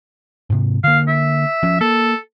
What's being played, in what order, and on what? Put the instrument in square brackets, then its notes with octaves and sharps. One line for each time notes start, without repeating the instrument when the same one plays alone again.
[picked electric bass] G#2 C3
[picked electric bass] D3 A#3 [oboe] F5
[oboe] E5
[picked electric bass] F3 C#4
[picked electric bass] A#3 [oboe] A4